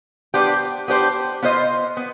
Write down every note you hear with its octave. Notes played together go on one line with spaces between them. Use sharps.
B3 D4 G4 C5
B3 D4 G4 C5
B3 F4 C5 D#5
B3